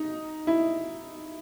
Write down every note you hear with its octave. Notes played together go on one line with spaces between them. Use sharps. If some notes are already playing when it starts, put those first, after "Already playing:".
Already playing: D#4
E4